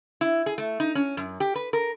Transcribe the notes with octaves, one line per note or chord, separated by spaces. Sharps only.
E4
G#4
A3
D#4
C#4
F#2
G4
B4
A#4